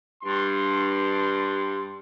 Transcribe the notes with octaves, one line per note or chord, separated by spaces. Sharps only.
G2 C6